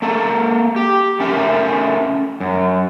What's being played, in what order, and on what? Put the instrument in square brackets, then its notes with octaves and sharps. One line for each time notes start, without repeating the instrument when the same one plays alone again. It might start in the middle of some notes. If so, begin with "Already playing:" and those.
[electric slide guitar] A#3 A4
G4
A3 C#4 A#4 E5
F#2